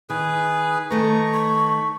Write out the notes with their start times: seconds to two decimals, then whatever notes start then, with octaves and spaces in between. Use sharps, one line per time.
0.10 D#3 G#4 B4
0.91 D#3 A3 B4 A#5 C#6
1.34 B5 C#6